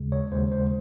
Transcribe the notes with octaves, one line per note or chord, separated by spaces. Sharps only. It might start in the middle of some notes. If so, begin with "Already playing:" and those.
Already playing: D#2 C#3 G#3
C#5
D#2 C#3 G#3 C5
C5